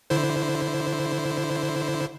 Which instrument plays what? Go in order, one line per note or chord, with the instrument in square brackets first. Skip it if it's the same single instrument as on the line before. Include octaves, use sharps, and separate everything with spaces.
[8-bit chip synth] D3 E4 C5